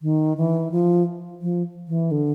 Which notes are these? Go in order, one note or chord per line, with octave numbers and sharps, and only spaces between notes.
D#3
E3
F3
F3
E3
D3